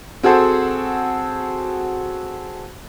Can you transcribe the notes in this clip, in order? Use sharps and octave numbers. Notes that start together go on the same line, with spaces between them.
C4 F#4 G#4 A4 C5